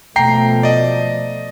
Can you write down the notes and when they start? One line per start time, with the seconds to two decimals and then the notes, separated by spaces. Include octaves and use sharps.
0.16 B2 F3 A3 G5 A#5 C7
0.63 D5 D#5